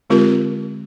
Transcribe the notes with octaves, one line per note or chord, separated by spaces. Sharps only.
D3 G#3 C4 F4 G4 A#4